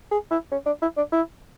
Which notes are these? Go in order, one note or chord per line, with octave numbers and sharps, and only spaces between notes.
G#4
E4
C#4
D4
E4
D4
E4